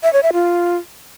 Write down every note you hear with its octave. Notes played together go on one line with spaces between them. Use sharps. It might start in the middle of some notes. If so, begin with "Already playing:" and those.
E5
C#5
E5
F4